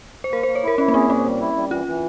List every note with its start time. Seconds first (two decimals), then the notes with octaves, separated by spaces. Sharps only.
0.24 C5
0.32 A#3 A#4
0.43 C5
0.48 A#3
0.55 C#5
0.63 E4 A#4
0.78 C#4 E4
0.88 A#3
0.94 C4 G#4
1.10 A#2 C#4
1.26 G3
1.41 E4
1.56 G3
1.71 E3 F4
1.87 E3